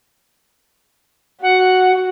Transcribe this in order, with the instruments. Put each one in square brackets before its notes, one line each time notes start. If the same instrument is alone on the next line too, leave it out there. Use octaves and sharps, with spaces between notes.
[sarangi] F#4 [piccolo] F#5